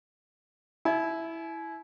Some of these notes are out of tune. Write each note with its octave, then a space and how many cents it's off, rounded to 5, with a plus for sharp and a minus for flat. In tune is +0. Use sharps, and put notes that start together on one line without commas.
E4 +0 G#5 +45